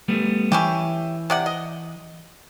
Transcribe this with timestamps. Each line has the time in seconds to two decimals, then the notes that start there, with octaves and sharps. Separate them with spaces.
0.08 G3 A3 B3
0.52 E3 C#4 E4 G4
1.30 C3 D5 F#5
1.46 D#5